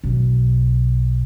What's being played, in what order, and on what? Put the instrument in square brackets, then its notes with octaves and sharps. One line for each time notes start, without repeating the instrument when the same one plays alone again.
[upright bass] B1